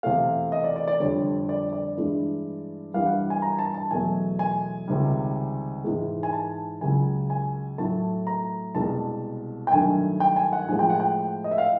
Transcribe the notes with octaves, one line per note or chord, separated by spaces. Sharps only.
E2 C3 E3 A3 F5
D#5
D5
D5
D5
F2 D3 G3 C#5
D5
D5
G2 E3 G#3
G2 E3 G3 F5
F#5
G#5
A#5
A5
A5
E2 B2 F#3 A3 G#5
G#5
C#2 C3 D#3 G3
G#2 E3 G#3
G#5
A5
C#2 C#3 F#3 G#5
G#5
A2 F#3 A3 A5
A#5
C2 B2 G#3 A5
G5
G2 D#3 F#3 A3 G#5
G5
G#5
F#5
A2 F3 G#3 G#5
G5
F#5
G5
D#5
E5
F5